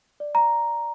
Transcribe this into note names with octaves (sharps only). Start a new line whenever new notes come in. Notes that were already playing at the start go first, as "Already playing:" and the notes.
D5
A#5